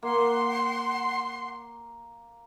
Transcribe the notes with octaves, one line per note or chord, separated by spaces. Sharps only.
A#3 F#5 C6